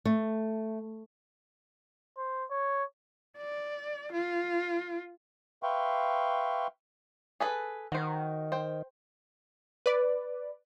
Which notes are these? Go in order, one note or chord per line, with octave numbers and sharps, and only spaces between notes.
A3
C5
C#5
D5
F4
B4 E5 F5 G5 C6 C#6
G#4 A4 B4
D#3 F#4 C5
C5 G5
B4 D5